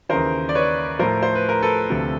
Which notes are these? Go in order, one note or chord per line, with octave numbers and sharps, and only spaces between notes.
D#2 C#3 E3 A#4 C5
D5
B4 C#5
A2 F3 A#4 C5
C5
B4
A#4
A4 B4
D2 C3 F3